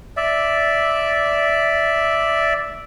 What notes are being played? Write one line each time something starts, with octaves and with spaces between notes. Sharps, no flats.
D5 E5